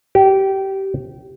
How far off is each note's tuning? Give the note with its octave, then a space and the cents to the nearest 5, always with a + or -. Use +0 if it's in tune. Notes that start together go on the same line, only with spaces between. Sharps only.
G4 -20